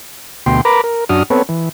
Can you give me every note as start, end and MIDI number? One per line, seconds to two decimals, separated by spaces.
0.46 0.61 38
0.46 0.61 47
0.46 0.61 79
0.46 0.61 84
0.65 0.81 70
0.65 0.81 71
0.65 0.81 82
0.65 0.81 83
0.65 0.81 86
0.84 1.04 70
1.09 1.23 42
1.09 1.23 62
1.09 1.23 66
1.09 1.23 87
1.09 1.23 89
1.30 1.42 59
1.30 1.42 60
1.30 1.42 69
1.30 1.42 71
1.30 1.42 73
1.49 1.69 52